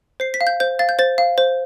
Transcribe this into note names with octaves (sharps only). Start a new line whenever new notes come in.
C5 C7
B6
F5
G6
C5 G6
F5 A6
G6
C5 A6
F5
C5